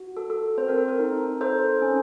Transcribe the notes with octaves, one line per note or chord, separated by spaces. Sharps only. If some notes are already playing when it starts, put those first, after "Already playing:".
Already playing: F#4
A4
A4
C4 C5
A#4
A4
A#4
D#4
A4 C5
C#4